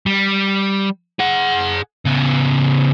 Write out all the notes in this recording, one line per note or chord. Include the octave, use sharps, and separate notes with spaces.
G3
G#4 F#5
C#3 B3